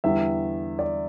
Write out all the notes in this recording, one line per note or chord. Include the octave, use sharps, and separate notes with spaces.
E2 D3 G3 E5
D5